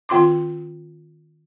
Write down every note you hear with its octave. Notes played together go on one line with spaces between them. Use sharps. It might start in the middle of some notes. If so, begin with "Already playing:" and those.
D#3 C4 F4 C6 D6